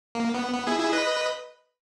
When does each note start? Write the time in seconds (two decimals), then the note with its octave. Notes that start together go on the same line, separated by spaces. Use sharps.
0.15 A#3
0.34 B3
0.54 B3
0.67 E4 G#4
0.80 E4 G#4
0.93 B4 D#5